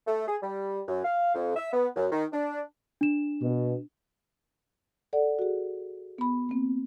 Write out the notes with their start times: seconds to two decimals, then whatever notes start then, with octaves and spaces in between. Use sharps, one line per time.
0.07 A3
0.28 G#4
0.42 G3
0.88 F#2
1.04 F5
1.35 F2
1.56 E5
1.73 B3
1.96 F#2
2.12 D#3
2.32 D4
3.01 D4 E7
3.41 B2
5.13 A4 D5 F#5
5.39 F#4 G#4
6.18 B3 B5
6.49 A#3 C4